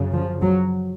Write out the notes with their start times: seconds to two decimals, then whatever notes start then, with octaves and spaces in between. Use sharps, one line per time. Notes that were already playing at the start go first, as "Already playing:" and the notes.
Already playing: F#2 C#3
0.13 F3
0.42 F#3